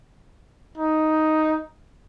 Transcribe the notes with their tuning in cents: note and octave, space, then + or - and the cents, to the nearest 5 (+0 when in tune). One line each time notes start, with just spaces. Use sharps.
D#4 +5